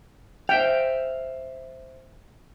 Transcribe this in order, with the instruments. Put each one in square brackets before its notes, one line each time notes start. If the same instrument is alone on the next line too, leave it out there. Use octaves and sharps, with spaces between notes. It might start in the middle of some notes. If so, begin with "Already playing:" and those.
[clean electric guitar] C5 E5 F5 [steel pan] G5